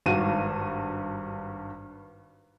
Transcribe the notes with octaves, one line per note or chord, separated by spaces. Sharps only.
G#1 G2 F#4 D#7